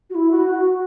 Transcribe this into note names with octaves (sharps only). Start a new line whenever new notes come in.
F#4
E4
F#4
F#4